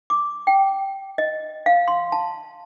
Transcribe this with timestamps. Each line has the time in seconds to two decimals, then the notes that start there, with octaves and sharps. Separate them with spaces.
0.10 D6
0.47 G5
1.18 D#5
1.66 F5
1.88 C6
2.12 A5